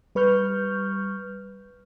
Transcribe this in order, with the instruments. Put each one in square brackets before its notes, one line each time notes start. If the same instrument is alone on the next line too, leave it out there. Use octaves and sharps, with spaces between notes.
[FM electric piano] G3 B4 C#6 F6 G6